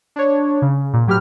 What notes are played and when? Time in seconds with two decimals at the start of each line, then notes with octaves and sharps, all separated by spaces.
0.16 D4 C#5
0.62 C#3
0.93 A#2
1.07 A2 F#3 G4 B4 F6